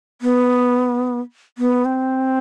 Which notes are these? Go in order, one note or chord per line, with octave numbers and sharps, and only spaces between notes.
B3
B3
C4